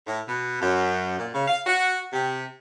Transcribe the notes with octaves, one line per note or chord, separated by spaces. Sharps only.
A2
B2
F#2
A#2
C#3
F5
F#4
C3